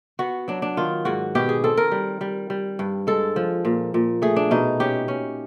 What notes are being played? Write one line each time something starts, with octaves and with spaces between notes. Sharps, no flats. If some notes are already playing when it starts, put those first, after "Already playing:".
B3 F#4
F#3 D4
D4
D#3 F4
G#2 F#4
B2 G4
G#4
C4 A4
A#4
G3
G3
G3
G2
G#3 A4
F3
A#2
A#2
A3 G#4
D4
B2 D#4
C#4 G4
C#4